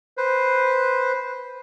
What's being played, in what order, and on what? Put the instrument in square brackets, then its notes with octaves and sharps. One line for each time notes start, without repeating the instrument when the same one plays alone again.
[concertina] B4 C5